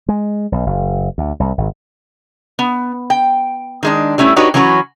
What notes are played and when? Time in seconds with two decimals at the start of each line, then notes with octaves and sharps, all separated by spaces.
0.09 G#3
0.52 B1
0.66 F#1
1.18 D2
1.40 C2
1.58 G#1
2.59 B3
3.10 G5
3.83 D#3 G#3 D4
4.18 G3 A3 C#4 E4
4.36 D4 D#4 F#4 G4 B4 C#5
4.54 E3 F#3 C#4 F#4 A#4 B4